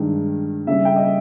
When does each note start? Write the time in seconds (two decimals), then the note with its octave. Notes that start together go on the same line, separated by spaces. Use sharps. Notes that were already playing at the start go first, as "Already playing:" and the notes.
Already playing: G2 D#3 G#3
0.67 C#3 G3 C#4 E5
0.85 G5
0.96 D#5
1.03 E5